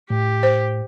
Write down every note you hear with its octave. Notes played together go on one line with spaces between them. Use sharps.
A2 G4
C5